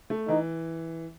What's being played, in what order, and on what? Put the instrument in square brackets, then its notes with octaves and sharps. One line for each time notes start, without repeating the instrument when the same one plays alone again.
[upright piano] A3
[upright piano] E3 [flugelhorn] D#4